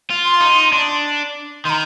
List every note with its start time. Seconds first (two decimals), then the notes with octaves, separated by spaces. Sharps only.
0.10 F4
0.25 C6
0.41 D#4
0.72 D4
1.65 D#3 A#5 C6